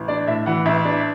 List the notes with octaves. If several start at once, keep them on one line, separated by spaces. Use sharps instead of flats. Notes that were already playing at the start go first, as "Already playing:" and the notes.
Already playing: A1
D4 D5
A2 E5
E3 F#5
A1 E5
D4